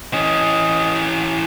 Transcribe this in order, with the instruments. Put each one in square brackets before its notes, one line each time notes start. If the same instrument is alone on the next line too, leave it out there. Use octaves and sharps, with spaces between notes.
[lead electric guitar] E3 C#4 [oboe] D#5